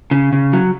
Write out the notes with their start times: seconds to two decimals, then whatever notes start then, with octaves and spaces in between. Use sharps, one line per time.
0.11 C#3
0.33 C#3
0.53 F#3